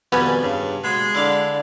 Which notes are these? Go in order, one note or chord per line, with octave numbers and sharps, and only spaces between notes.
F2 B2 D#3 G3 B3 B4 G#5
G2 C#3
B2 G#3
D3 E4 D5 F5